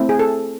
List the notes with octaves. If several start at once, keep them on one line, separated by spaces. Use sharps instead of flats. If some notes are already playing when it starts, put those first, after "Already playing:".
Already playing: A3 C4 E4
G#4
A4